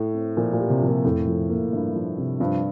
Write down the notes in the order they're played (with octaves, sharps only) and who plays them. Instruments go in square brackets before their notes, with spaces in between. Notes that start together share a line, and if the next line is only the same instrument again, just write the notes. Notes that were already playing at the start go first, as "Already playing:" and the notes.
Already playing: [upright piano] A2
[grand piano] C4
[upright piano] A#2 [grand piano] F3
[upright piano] A#2
[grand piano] G4
[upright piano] C3
[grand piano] F3
[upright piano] A#2
[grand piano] F2 [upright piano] A2
[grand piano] F3
A#3
[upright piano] G2 [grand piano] F3
[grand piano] F3
C3
[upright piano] G2 [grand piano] F3